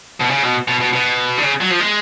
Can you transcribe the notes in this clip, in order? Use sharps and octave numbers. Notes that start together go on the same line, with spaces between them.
B2
C#3
B2
B2
B2
B2
D3
C#3
F#3
F3
G#3